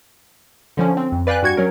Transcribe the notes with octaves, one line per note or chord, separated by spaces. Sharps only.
D3 F3 C#4
C4
F2
B4 D5 F5 G5 G#5 F#6
G2 F#4 G#6 C#7
F#3 C#4 A#4